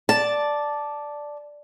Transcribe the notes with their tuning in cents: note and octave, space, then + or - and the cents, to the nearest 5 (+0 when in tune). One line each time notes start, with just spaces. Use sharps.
D5 +0 A5 -5